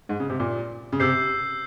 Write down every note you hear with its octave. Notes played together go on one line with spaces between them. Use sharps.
G#2
C#3
C3
A#2
C#3
C3 E6 G6 C7